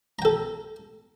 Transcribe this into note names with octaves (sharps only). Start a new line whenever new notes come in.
A4 G5 A#5